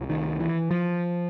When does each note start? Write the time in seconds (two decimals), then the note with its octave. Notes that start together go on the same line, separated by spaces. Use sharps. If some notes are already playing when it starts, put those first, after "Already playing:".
Already playing: C#2 C3
0.10 D#3
0.40 E3
0.71 F3